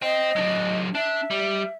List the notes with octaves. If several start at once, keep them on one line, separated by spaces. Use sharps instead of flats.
C5 D#5 G5
F#3 D4
D4 E5
G3